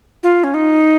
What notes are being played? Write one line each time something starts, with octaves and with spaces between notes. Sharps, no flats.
F4
C#4
D#4